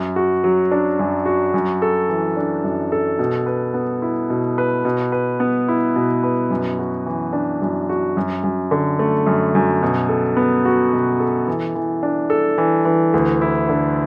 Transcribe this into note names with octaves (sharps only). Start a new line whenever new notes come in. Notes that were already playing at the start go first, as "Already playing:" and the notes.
Already playing: F#2
F#4
F#3
D4
F#2
F#4
F#2
A4
E3
D4
F#2
A4
B2
B4
B3
E4
B2
B4
B2
B4
B3
E4
B2
B4
F#2
F#4
E3
D4
F#2
F#4
F#2
F#2
D3
A3
F#2
F#2
B2
A4
B3
F#4
B2
A4
E3
E3
D4
A4
E3
E3
D2
E4
D3